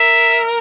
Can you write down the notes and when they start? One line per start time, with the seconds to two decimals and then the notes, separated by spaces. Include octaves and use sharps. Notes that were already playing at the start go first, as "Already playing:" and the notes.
Already playing: A#4 E5